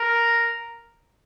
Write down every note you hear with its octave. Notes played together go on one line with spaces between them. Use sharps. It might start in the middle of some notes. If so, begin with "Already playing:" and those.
Already playing: A#4